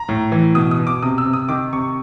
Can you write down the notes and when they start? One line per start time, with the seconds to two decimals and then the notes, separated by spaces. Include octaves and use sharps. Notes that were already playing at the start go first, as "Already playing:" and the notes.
Already playing: A#5
0.09 A2
0.32 E3
0.55 B2 D#6
0.71 D#6
0.79 B2
0.87 D6
1.02 C3 D#6
1.18 E6
1.25 C3
1.33 D#6
1.48 D#3 D6
1.73 C3 C#6